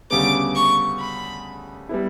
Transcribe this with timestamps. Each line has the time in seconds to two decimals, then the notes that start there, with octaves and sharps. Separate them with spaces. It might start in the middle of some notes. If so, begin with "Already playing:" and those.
0.11 D2 C#3 G3 B3 D6
0.56 C#6
1.00 B5
1.89 G3 B3 E4